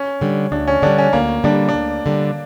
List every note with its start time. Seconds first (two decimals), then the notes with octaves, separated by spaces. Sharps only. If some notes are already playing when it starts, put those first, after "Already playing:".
Already playing: C#4
0.21 D3 G3
0.52 D2 D4
0.67 C#4
0.82 D3 G3 D4
0.98 C#4
1.13 D2 A#3
1.44 D3 G3 D4
1.69 D4
1.74 D2
2.06 D3 G3